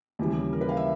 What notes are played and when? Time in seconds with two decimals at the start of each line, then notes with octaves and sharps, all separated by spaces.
0.19 D#2 C#3 E3 G3
0.53 A#4
0.61 B4
0.69 F5
0.77 E5